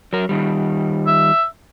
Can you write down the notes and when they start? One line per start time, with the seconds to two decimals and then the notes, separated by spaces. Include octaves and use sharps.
0.13 F#3 A#4
0.29 D#3 G3
1.07 E5